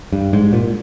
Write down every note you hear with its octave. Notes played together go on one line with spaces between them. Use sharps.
G2
G#2
A#2